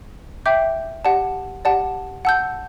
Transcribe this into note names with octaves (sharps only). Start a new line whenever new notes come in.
E5 G5 D6 G6
G4 D5 F#5 A5
G4 D5 F#5 A5
F#5 A5 E6 G6